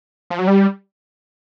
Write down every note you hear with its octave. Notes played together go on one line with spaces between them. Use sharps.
F3
F#3
G3